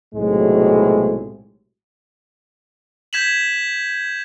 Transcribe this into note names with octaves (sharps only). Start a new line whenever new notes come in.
B1 A2 C3 F#3 G#3
G6 G#6 B6 E7 F#7